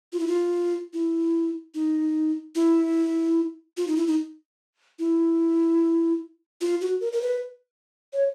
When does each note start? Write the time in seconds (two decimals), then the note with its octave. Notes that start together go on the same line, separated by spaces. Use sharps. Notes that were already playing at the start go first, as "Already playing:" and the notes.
0.13 F4
0.20 E4
0.27 F4
0.93 E4
1.75 D#4
2.55 E4
3.77 F4
3.87 D#4
3.97 E4
4.07 D#4
4.99 E4
6.61 F4
6.81 F#4
7.01 A#4
7.13 A#4
7.22 B4
8.13 C#5